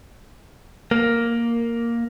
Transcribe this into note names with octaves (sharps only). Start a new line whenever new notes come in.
A#3